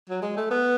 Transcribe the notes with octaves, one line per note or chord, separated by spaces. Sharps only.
F#3
G#3
A3
B3